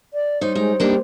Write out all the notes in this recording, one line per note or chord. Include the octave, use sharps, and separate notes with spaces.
D5
G3 D#4 C5 C#5
G#3 D#4 G4
G3 A#3 D4 D#4